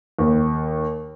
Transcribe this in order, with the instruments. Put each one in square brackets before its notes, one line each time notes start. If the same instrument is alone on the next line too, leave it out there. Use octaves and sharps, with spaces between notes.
[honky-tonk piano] D#2